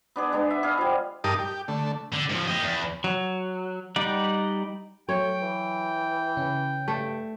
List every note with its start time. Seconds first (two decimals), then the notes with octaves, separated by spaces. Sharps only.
0.16 B3 D4 G#4
0.32 G#3 B3 D4 C6
0.51 E5
0.63 G#4 B4 D#5 F5
0.78 F3 G3
1.24 G2 D#4 G4 A#4 A5 D#6
1.39 G4
1.68 D3 A3
2.12 D3
2.29 G#2 F3
2.48 G4 D#5
2.62 E2
3.04 F#3
3.96 G3 D#4 D5 F#5
5.09 F#3 A3 C#5 G5
5.42 E3
6.37 C#3 C#4
6.88 G2 A3